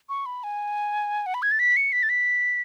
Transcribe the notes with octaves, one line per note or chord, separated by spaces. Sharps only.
C#6
B5
G#5
F#5
B5
G#6
A6
B6
C#7
B6
A6
B6